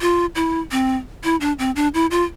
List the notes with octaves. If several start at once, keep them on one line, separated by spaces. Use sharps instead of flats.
F4
E4
C4
E4
D4
C4
D4
E4
F4